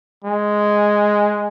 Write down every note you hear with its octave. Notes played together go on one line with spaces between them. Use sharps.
G#3